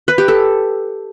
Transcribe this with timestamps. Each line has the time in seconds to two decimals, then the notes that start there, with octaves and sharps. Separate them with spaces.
0.08 B4
0.18 G4
0.28 A4